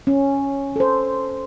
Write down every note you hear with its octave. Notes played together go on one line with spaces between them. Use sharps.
C#4
A4 C5